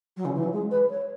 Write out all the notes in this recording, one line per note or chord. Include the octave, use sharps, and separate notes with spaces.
F#3
C#3
E3
F#3
G#3
B4
C#5